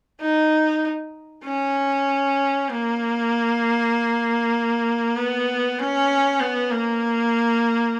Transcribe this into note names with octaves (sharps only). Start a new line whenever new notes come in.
D#4
C#4
A#3
B3
C#4
B3
A#3